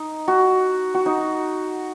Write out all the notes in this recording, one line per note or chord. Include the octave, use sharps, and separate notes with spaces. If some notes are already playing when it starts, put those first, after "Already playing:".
Already playing: D#4
F#4
F#4
D#4